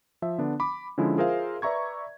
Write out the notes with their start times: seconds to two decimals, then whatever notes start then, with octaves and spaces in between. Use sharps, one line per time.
0.22 F3 E5
0.38 D3 B3 D4
0.60 B5 D6
0.98 D3 F3 G#3 C#4 E4
1.18 F4 G#4 A#4 C5 E5 F5
1.62 B4 D5 E5 A#5 C#6 G#6